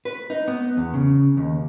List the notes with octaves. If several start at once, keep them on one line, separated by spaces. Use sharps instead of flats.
B4
D#4
B3
E2
C#3
D#2